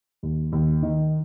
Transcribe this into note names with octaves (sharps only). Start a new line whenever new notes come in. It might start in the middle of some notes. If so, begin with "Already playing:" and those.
D#2
D#2
D#3